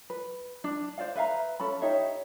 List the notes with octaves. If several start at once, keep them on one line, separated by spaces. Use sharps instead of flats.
B4
D4
C5 D5 F5
B4 E5 F5 A#5
C#4 A4 B5
D#4 G4 C#5 E5